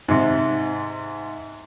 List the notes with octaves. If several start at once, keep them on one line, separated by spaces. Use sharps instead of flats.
G#2 C3